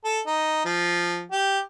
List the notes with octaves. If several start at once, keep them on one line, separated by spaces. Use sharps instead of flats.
A4
D#4
F3
G4